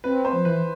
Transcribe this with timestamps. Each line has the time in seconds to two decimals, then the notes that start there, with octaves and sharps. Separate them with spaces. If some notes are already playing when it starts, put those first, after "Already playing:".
0.04 C4 B4
0.25 C5
0.33 F3
0.45 E3 B4